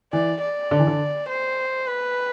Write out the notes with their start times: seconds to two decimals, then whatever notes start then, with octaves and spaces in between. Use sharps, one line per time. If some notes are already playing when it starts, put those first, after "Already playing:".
0.13 E3 D5
0.41 D5
0.71 D3
0.79 E3
0.87 D3
1.29 C5
1.87 B4